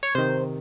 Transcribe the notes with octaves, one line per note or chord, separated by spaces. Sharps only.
C#5
C3 D#3 C5